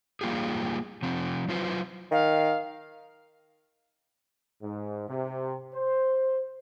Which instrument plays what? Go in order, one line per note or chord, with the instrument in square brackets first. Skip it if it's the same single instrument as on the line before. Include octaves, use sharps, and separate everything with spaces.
[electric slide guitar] G3 A#3 F4 G4 G#4
C3 F3 C4
F#3 F4 B4 C5
[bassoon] D#3 [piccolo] F5
[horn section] G#2
C3
C5